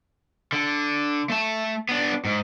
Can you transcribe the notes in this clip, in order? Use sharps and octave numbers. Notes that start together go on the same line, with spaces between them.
D3
A3 A5
B3 D4
G#2